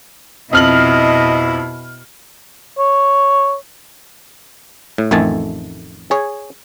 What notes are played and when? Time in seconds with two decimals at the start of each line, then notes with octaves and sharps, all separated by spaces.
0.53 F2 B2 E4 D#5 F6 F#7
2.78 C#5
4.98 A2
5.11 A1 F2 D#3 A3 G#5 A5
6.11 G#4 C#5